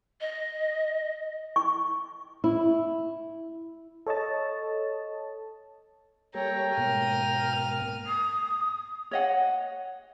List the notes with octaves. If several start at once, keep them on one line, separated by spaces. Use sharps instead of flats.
D#5
C#6
E4
A4 C#5 D#5 A5
G3 A#3 A4 C#5 G5 A#5
G#2 B2 A#3 F6 D#7
D#6
C#5 D#5 F#5